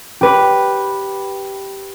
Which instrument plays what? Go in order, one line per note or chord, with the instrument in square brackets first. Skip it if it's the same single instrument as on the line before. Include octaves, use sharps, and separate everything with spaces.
[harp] G4 B4